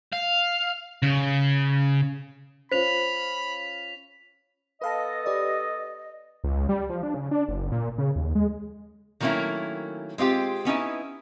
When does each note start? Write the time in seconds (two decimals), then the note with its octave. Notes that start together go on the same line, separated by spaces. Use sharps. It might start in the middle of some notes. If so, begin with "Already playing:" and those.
0.13 F5
1.03 C#3
2.72 C#4 F4 C5 B5 B6 F7
4.82 B3 A4 B4 D#5 F5 A5
5.26 G4 B4 D5
6.44 C#2
6.69 G3
6.89 F3
7.03 D4
7.14 C#3
7.31 D4
7.48 F#1
7.72 A#2
7.98 C#3
8.16 D#2
8.35 G#3
9.20 D#3 F#3 A3 A#3 C#4 E4
10.18 G#3 C4 F4 G4
10.65 B3 C#4 D#4 E4